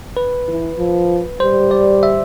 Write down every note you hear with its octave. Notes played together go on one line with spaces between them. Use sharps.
B4
E3
F3
G3 C5
D5
E5